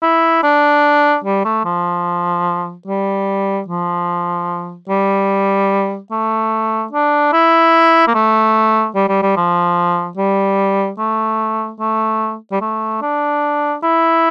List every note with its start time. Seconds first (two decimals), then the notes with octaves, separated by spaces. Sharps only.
0.02 E4
0.43 D4
1.24 G3
1.45 A3
1.65 F3
2.87 G3
3.68 F3
4.89 G3
6.11 A3
6.92 D4
7.33 E4
8.07 A#3
8.14 A3
8.95 G3
9.09 G3
9.22 G3
9.36 F3
10.17 G3
10.98 A3
11.79 A3
12.52 G3
12.61 A3
13.02 D4
13.83 E4